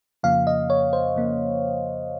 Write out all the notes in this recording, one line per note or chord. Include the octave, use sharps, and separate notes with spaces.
F2 C#3 F3 A#3 F5
D#5
C#5
C5
F2 C#3 F3 A#3